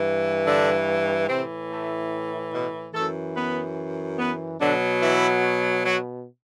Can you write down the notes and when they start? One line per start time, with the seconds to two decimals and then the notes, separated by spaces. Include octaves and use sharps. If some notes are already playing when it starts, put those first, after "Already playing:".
Already playing: G2 E3
0.47 D3 D4
1.29 A2 C3 E3 C4
1.70 A3
2.53 B2 B3
2.94 F#2 E3 A3 A4
3.36 B3 B4
4.19 B3 B4
4.60 B2 D3 F#3 D4
5.02 E3 E4
5.85 F#3 F#4